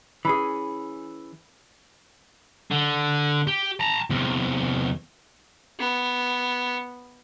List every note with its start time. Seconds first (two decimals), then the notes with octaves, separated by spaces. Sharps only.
0.25 E3 C#4 G#4 B5 D#6
2.71 D3
3.47 G4
3.80 A5 A#5
4.10 E2 C3
5.79 B3